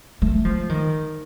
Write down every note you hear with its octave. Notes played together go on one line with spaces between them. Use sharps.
A3
F3
D#3